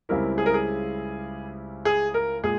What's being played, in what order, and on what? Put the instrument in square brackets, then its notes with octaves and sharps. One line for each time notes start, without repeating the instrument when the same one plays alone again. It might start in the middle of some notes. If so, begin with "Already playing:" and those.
[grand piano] C#2 C#3 G3 C4 E4 A#4
G#4
A#4
G#4
G#4
A#4
A#2 G#3 G#4